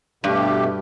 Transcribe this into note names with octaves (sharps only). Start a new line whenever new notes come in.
G2 B2 A3 G4